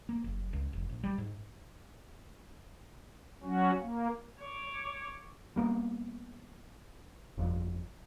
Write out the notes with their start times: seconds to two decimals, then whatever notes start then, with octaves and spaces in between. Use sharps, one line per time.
0.09 A#3
0.24 F#1
0.53 C#2
0.73 F1
0.89 A#1
1.03 G3
1.18 G#2
3.43 F#3 C#4 F#4
3.81 A#3
4.41 C#5 D6
5.56 G3 A#3 B3
7.37 G1 F2